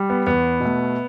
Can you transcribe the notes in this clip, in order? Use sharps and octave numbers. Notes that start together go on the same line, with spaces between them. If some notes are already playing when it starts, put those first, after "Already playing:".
Already playing: G3
B3
E2 B3
B2 A3